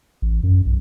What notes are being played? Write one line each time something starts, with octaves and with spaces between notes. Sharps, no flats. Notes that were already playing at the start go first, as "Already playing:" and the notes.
A1
F#2
B1